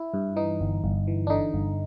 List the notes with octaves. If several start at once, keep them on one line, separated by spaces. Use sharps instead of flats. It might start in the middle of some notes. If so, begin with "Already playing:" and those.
Already playing: E4
G2
E3 D#4
G1
G1
E3
D4
D3 D#4
G1